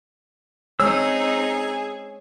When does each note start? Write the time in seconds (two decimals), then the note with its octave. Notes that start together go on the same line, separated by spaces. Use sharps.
0.80 G#3 C4 D#4 G#4 C#5 E6